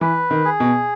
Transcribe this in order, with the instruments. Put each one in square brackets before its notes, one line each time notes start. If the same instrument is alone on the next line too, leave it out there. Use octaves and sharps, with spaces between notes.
[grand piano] E3 [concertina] B4
[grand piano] D#3
[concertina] G#4
[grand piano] B2